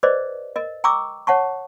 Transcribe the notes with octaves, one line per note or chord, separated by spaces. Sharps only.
G#4 B4 C5 D5 D#5
A#4 D#5
G5 A#5 C#6 D6 E6
C#5 F#5 A5 C#6